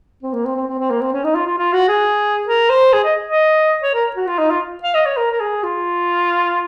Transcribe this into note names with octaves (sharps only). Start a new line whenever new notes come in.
C4
A#3
C4
C4
C4
C4
A#3
C4
C#4
D#4
F4
F4
F4
F#4
G#4
A#4
C5
G#4
D#5
D#5
C#5
A#4
F#4
F4
D#4
F4
F5
D#5
C#5
A#4
A#4
G#4
F4